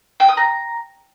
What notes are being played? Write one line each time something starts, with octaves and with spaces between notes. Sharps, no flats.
G5
D#6
A#5